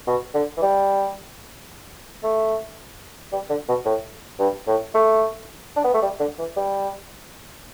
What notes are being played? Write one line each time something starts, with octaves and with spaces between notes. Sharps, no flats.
B2
D3
E3
G3
A3
G3
D3
B2
A2
G2
A2
A3
D4
B3
A3
G3
D3
E3
G3